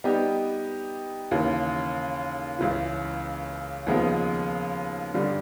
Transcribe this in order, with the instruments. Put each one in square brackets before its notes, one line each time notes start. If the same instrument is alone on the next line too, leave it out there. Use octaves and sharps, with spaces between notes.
[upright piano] G3 B3 D#4 G4
D#2 C#3 E3
C#2 C#3 E3
D#2 C#3 F3 G#3 B3
G2 D3 G3